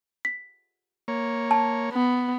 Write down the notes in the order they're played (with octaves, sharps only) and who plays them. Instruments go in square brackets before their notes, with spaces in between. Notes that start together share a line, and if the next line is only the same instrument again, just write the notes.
[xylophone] B6
[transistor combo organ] A#3 C#5
[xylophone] A5
[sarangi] B3